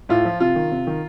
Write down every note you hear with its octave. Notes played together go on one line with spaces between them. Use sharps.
A2 F4
F3
C3 F4
D#3
C3
D#3